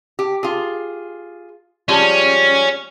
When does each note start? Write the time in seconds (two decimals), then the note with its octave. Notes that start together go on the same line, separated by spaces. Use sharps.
0.19 G4
0.43 F4 G#4
1.88 F3 G3 G#3 C#4